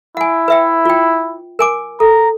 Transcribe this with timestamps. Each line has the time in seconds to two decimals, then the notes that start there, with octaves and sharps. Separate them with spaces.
0.17 E4 F#5 G#5
0.48 B4 E5 G5
0.85 F4 G5
1.59 A#4 G#5 D6
2.00 A4 A#5